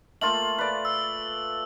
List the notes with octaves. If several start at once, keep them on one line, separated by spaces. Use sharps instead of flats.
A3 A#3 F4 F#7
B4 D5
E6